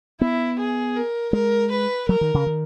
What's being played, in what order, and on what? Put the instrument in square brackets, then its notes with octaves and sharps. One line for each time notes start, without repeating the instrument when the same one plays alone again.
[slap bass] B3 [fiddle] E4
[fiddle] G#4
A#4
[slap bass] G#3 [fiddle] A#4
[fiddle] B4
[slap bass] F#3 [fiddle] A#4
[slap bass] D#3
C#3
D#3